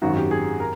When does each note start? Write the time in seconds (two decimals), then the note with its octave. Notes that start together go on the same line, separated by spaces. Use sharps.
0.02 G#1 F#2 D#3 F#4
0.16 G4
0.31 G#4
0.60 A#4